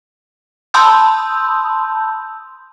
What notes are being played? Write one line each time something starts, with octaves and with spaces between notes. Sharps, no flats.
A5 B5 C6 D#6 E6 G6